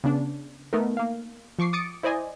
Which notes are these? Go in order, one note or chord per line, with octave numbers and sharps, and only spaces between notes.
C#3 B3 D4
A3 B3 D#4 A#4
A#3 F5
F3 C#6 D6 C7
D6 D#6 A6 C#7 D7
E4 C5 D5 D#5 G#5